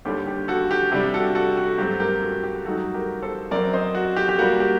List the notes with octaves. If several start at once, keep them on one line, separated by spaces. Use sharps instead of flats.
D#2 D3 G3 G4
G4
F#4 A4
G4
C3 G3 D4 G4
F#4 A4
F#4 A4
F#4
G2 F#3 A3 C4 G4
G4 A#4
F#4 A4
G4
G2 F#3 A3 D#4 F#4 A4
G4 A#4
A4 C5
F#2 F#3 C4 A#4 D5
C5 D#5
F#4
G4
G4
A#2 G3 A#3 F#4
G4